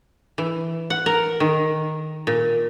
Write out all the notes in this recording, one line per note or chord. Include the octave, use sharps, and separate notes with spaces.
E3
F#5
A#4
D#3
A#2